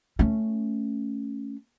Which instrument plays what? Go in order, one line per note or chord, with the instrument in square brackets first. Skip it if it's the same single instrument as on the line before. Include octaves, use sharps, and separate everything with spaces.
[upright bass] A3 C#4